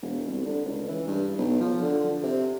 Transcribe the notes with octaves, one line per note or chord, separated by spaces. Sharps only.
E1
C2
D3
C#2
E3
G2
B1
F3
D3
C3